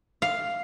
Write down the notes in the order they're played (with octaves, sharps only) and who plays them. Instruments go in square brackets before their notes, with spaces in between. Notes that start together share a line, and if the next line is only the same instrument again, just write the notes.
[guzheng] F5